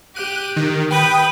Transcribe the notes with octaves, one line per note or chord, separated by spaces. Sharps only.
G4 F#6 D#7
D#3
B4 G5 B5 D#6